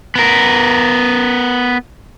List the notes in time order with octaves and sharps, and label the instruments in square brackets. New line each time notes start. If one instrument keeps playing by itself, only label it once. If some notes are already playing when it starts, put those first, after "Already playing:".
[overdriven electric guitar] B3 A#4